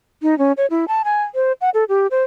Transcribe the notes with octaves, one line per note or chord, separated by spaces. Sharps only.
D#4
C#4
C#5
E4
A5
G#5
C5
F#5
A4
G4
C5